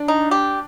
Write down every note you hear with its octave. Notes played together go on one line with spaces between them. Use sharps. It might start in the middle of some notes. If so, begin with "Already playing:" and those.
Already playing: D4
D#4
G4